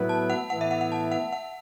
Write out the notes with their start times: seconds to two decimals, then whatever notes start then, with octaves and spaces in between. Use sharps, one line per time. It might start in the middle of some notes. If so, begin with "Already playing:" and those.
Already playing: A2 F#3 B3 E4 B4
0.09 A5
0.30 F#5
0.50 A2 E3 B3 E4 F#5
0.61 E5
0.71 F#5
0.81 F#5
0.92 A5
1.12 F#5
1.33 F#5